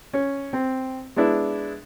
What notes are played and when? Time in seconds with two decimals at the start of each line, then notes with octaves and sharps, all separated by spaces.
0.13 C#4
0.53 C4
1.16 G#3 B3 D4 E4